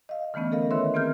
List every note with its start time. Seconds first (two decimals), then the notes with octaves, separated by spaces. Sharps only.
0.09 D#5 F5
0.34 D3 E3 A3 B3 C#4
0.52 A4 A#4 D#5 F5
0.71 D#3 E4 B4 C#5 E5 C6
0.94 A#3 C4 G#4 A#4 F6 G6